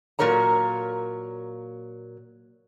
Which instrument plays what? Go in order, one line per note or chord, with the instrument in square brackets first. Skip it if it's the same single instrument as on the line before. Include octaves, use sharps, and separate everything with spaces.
[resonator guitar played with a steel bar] A#2 F#3 A#4 C#5 A#5